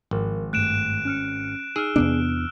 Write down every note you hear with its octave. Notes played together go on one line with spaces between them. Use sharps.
G#1 F3 A#4
G2 A3 F#6 D7 E7
C#4 F6 C#7
D#4 G#4 E6 F6
E2 C3 B3 D4 D7